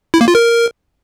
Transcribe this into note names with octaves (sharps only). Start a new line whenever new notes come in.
E4
A#3
F4
A#4